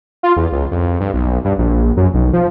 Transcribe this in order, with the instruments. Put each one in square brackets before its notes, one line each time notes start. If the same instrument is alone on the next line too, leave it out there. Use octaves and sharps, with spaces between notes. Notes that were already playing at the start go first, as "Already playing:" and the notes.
[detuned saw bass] F4
E2
C#2
F2
G2
B1
G2
A#1
F#2
B1
F3